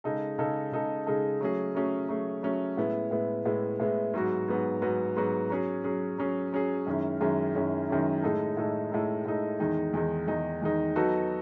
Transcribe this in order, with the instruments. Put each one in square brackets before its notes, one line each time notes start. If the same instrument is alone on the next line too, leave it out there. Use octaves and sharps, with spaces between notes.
[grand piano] C#3 G#3 D#4 A4
C#3 G#3 D#4 A4
C#3 G#3 D#4 A4
C#3 G#3 D#4 A4
F#3 A3 C#4 G#4
F#3 A3 C#4 G#4
F#3 A3 C#4 G#4
F#3 A3 C#4 G#4
A2 G#3 B3 E4
A2 G#3 B3 E4
A2 G#3 B3 E4
A2 G#3 B3 E4
G#2 F#3 B3 F#4
G#2 F#3 B3 F#4
G#2 F#3 B3 F#4
G#2 F#3 B3 F#4
F#3 C#4 G#4
F#3 C#4 G#4
F#3 C#4 G#4
F#3 C#4 G#4
F#2 D#3 G#3 C#4 E4
F#2 D#3 G#3 C#4 E4
F#2 D#3 G#3 C#4 E4
F#2 D#3 G#3 C#4 E4
A2 G#3 D#4 A4
A2 G#3 D#4 A4
A2 G#3 D#4 A4
A2 G#3 D#4 A4
E2 D#3 G#3 D#4
E2 D#3 G#3 D#4
E2 D#3 G#3 D#4
E2 D#3 G#3 D#4
F#3 B3 D#4 F#4 A4